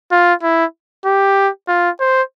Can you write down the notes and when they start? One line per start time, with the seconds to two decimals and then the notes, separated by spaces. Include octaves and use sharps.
0.12 F4
0.43 E4
1.05 G4
1.68 F4
2.00 C5